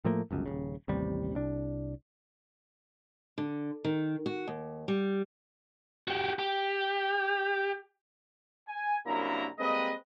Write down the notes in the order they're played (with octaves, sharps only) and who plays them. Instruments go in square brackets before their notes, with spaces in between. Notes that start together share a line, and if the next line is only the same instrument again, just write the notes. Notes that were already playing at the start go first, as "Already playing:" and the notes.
[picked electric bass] A2 F3 A3 A#3
G1 C#2 F#2
D#1 G#1 C#3
A1 D#2 C3 G3
C2 D4
[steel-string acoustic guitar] D3
D#3
F#4
D#2
G3
[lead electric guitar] F#4 G4
G4
[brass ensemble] G#5
C2 F#2 A#3 D4 E4 A#5
G3 G#3 A#3 C4 B4 D#5